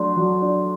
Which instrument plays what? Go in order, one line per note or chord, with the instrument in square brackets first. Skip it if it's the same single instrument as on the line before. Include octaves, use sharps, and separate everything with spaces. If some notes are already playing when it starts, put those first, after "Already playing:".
Already playing: [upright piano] F#3 A3 D4 [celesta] C6
[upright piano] F#3
D4